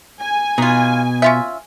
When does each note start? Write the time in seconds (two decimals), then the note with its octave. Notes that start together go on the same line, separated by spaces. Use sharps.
0.19 G#5
0.58 B2 D#4 F4
1.22 C#4 F4 E5